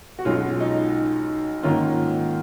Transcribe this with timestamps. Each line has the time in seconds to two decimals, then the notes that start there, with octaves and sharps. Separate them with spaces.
0.19 F#4
0.25 B1 B2 G#3 C#4 F4
0.60 D#4
1.63 G#2 D#3 A#3 C#4 F4